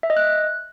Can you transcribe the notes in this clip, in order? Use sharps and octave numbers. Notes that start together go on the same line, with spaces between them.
E5
D#5
F#6